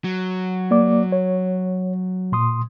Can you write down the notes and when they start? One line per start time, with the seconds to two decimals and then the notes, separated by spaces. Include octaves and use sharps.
0.04 F#3
0.71 A#3 D5 D6
1.12 C#5
2.32 A#2 C6 D#6